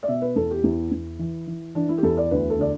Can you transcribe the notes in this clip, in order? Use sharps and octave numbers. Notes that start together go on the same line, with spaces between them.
D5
B2 E5
B4
E2 A4
G4
E2 E4
E2
E3
E3
E3 D4
E4
G4
E2 A4
D5
D2 B4
A4
D3 D5